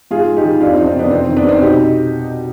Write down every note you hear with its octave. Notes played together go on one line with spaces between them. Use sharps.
G#2 F4 G#4
G#3
D#4 G4
D#3
F2 D4 F4
C4 D#4
F3
C4 D#4
C3 B3 D4
F2 C4
C4
D#3
B3 D4
C3 C4 D#4
B2 D#4 G4